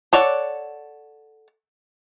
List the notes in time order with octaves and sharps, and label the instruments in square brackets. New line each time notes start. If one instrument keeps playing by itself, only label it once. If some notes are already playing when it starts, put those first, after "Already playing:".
[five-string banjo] A4 C#5 D5 F#5